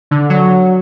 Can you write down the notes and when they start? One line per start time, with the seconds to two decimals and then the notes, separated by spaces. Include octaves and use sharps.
0.11 D3
0.30 F#3